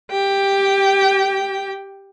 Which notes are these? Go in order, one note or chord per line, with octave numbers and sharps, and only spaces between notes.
G4 G5